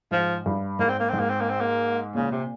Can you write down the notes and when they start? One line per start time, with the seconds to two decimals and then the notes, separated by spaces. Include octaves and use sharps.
0.11 G#2 F3
0.46 G2
0.79 G#2 A#3
0.89 C4
1.00 A#3
1.10 G#2 C4
1.19 A#3
1.30 C4
1.41 A#3
1.50 C4
1.61 A#3
2.15 A#2 C#3
2.32 C3